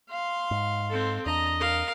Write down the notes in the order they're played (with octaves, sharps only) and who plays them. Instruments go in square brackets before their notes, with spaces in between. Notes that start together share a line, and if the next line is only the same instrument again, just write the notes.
[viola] F5 C6
[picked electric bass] G#2
[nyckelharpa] C4 A4
[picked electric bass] E2 D4 [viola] D#5 [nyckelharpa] A#5
[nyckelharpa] A#4 F5